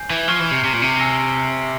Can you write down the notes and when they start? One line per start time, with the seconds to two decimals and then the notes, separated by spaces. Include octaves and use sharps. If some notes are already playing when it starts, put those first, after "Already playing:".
Already playing: G#5 G6 C7
0.10 E3
0.28 F3 C#6 F6 G#6 C7 G7
0.39 E3
0.51 C3
0.64 C3
0.73 A#2
0.82 C3
0.98 G#5 E6 A#6 C#7